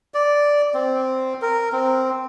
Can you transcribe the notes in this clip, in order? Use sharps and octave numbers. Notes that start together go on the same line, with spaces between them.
D5
C4
A#4
C4